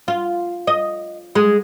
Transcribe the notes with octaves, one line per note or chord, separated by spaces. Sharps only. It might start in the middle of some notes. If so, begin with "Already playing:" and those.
F4
D#5
G#3